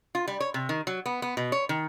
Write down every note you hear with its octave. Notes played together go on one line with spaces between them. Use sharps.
F4
G3
C#5
C3
D#3
F#3
B3
B3
B2
C#5
D#3